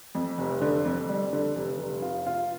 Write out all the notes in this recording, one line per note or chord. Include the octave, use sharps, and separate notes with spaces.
F2
F1
D3
F2
G3
D3
F1
F1
F4
F4